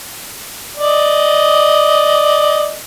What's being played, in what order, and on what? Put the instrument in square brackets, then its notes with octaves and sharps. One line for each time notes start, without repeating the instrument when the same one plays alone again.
[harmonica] D5 D#5